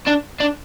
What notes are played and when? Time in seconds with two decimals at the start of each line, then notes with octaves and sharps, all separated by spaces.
0.07 D4
0.40 D4